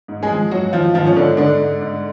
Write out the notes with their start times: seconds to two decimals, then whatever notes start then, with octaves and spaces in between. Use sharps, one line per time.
0.08 G#2
0.22 G#3 G#4
0.30 F3
0.51 G#2 F#3 F#4
0.73 F3 F4
0.94 G#2 F3 F4
1.06 C#4
1.16 G#2 D3 D4
1.37 G#2 D3 D4
1.59 G#2
1.81 G#2